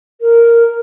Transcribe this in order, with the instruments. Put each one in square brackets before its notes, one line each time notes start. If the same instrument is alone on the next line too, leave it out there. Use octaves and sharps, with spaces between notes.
[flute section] A#4